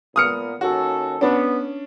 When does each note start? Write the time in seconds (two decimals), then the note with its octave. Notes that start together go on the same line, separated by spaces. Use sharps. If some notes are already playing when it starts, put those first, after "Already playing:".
0.16 A#2 B3 D#6 F6 C#7
0.61 D#2 C#4 F#4 A4
1.21 B3 C#4 D4